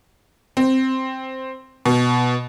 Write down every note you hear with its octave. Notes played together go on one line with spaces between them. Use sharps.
C4
B2